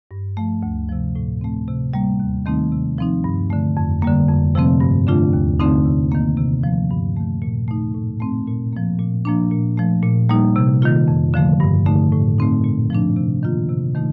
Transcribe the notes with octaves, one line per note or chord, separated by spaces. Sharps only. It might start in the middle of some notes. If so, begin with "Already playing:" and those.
G2
F3 A3
D2
C3 F3
A2
A3 C4
C3
G3 A#3
D#2
D#3 A3 C4 D#4
C3
F3 C4 D#4
G2
D3 A3
F2
D3 G3 A#3
F2
C3 F3 A3 C4
G2
D3 A3 D4 F4
D#2
D3 A3 C4 D#4
C3
D#3 A#3
C3
F3 A3
G2
D#3 A3
A#2
A3 D#4
A2
A3 C4
A#2
F3 A#3
A#2
F3 A#3 D4
A#2
F3 A3
A#2
G3 A#3 D#4
C3
D#3 A#3 F4
F2
D3 F3 A3
G2
D3 A3 D#4
A2
A3 C4 D#4
A#2
F3 A3 D4
C3
D#3 A#3 F4
C3
D#3 A3 D#4